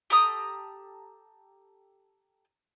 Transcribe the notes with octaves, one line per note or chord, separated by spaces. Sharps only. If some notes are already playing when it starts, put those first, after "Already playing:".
G4 A4 A#5 D#6